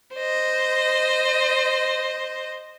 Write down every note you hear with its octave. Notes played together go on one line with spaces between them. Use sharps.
C5 D#5